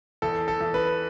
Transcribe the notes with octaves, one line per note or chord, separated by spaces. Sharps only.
E2 A4
A4
E2
B4